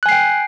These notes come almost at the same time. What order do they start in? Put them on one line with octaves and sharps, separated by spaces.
F#6 G#5 C7 G5